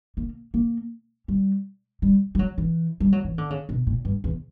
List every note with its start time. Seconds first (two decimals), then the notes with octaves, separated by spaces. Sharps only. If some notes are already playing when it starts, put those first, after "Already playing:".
0.17 A#3
0.54 A#3
1.28 G3
2.02 G3
2.35 G3
2.39 F#3
2.58 E3
3.00 G3
3.12 F#3
3.25 E3
3.38 D3
3.50 C#3
3.69 B2
3.87 A#2
4.05 G2
4.24 E2